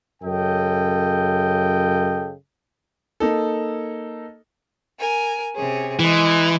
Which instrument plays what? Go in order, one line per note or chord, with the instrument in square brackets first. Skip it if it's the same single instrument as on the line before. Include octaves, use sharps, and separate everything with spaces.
[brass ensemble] F#2 C#3 A4 D#5 G5
[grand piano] A#3 D#4 A4
[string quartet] A#4 G#5
C3 C#4 G#4
[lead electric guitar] E3 [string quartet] G#3